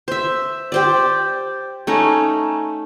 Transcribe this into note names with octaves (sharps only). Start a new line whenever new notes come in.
C5 E5
G4 C5 D5
A3 C#4 D#4